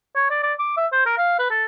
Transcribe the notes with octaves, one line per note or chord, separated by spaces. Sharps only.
C#5
D5
D5
D6
E5
C5
A#4
F5
B4
A4